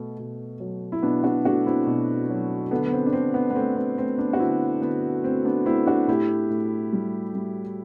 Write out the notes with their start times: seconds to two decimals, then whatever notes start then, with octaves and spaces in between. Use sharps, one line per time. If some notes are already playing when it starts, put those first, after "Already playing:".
Already playing: B2 A3
0.19 B2
0.60 F#3
0.92 E4
1.02 B2 B3 D4
1.24 D4 F#4
1.45 A3 D4 F#4
1.66 C4 E4
1.87 B2
2.30 F#3
2.71 D3 B3 D4
2.86 B3
2.92 C4
3.06 D4
3.13 D3 C4
3.34 B3
3.50 B3
3.56 A3 C4
3.76 B3
3.98 A3 C4
4.18 B3 D4
4.33 F#4
4.39 D3 C4 E4
4.81 D3 B3
5.24 A3 C4
5.45 B3 D4
5.65 A3 C4 E4
5.86 D4 F#4
6.07 A2 E4 G4
6.50 A2
6.93 G3
7.35 G3